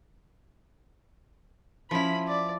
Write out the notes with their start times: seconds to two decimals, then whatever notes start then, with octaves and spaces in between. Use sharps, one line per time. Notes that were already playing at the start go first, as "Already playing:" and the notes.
1.91 F3 C#4 E4 B5
2.28 D5